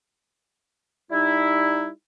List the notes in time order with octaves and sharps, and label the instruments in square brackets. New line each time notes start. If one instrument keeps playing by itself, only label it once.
[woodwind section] G3 D#4 E4